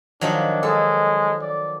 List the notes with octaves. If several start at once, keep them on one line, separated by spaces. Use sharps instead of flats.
D#3 F3 F#3 D4
G#3 A4
D5